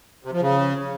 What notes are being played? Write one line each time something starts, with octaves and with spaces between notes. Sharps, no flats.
C3
F3
C#3